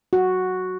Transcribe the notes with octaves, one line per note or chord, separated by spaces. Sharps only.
F#4